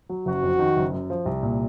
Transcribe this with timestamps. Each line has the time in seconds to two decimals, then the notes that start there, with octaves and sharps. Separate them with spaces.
0.09 F#3
0.26 F#1 F#4
0.42 F2
0.59 D#3
0.77 F#1
0.93 F#2
1.10 F3
1.26 C2
1.43 A#2